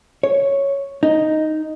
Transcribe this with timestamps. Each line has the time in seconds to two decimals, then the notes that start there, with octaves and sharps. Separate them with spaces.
0.23 C#5
1.03 D#4